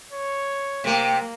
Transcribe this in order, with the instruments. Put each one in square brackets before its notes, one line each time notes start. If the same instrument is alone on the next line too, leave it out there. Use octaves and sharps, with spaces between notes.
[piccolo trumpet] C#5
[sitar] C3 G4 [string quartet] A#3